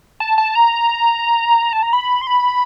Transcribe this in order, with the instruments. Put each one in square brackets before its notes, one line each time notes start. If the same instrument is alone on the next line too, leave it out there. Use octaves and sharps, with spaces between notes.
[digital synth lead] A5
A5
A#5
A5
A#5
B5
C6
B5